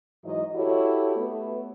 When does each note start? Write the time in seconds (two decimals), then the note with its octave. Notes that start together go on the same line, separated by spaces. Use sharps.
0.25 G#2 E3 F#3 D#5
0.56 E4 F#4 G4 A4 C#5
1.16 A3 B3